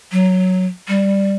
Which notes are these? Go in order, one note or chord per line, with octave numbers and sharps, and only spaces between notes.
F#3
G3